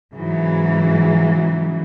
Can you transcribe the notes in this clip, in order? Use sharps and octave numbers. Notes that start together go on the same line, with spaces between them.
G#2 C#3 E3 F#3